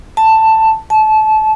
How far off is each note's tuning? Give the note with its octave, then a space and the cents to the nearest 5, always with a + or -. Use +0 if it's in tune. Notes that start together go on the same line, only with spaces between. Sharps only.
A5 +10
A5 -25